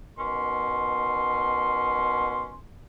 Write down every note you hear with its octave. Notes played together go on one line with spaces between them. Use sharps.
B2 D#3 C#4 C6